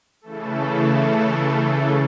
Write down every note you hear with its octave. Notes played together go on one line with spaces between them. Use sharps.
C#3 E3 A3 A4